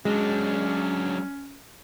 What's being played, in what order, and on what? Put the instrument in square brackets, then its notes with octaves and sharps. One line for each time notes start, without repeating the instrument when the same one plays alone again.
[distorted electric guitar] F#3 D4 [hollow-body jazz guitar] G#3 [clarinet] C#4